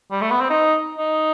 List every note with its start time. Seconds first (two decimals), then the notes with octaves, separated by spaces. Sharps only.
0.12 G3
0.21 A3
0.31 B3
0.41 C4
0.50 D#4
0.99 D#4